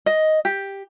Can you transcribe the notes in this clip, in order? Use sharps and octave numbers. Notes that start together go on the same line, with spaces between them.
D#5
G4